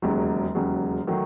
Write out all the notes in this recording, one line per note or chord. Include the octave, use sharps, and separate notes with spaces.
E1 D#2 C#3 F#3
E1 D#2 C#3 F#3
D#3 F#3 A3